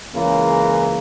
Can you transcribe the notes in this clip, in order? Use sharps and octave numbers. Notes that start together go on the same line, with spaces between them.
C#2 C#3 E3 A#3 E4